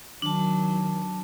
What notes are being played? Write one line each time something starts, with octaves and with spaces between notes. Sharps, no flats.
D#3 F#3 D4 A5